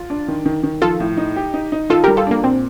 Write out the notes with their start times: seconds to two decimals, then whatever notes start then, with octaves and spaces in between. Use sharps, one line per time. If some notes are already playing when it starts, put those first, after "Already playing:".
Already playing: F4
0.10 D4
0.28 D#3
0.46 D#3
0.63 D#3
0.82 F3 F4 A4
1.00 A2
1.17 D#4
1.36 G4
1.54 D#4
1.72 D#4
1.90 D#3 F4 A4
2.04 G4 A#4
2.08 G3
2.17 F4 A4
2.27 A#3 D4
2.44 A#2 C4